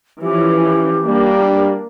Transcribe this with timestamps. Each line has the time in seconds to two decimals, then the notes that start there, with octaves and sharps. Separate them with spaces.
0.22 E3 F3 C#4 G4
1.06 G3 A#3 D4